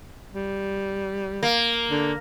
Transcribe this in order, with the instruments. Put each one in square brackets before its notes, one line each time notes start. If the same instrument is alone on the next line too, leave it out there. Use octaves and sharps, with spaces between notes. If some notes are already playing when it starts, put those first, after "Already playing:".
[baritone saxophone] G3
[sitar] A#3
[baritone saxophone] D3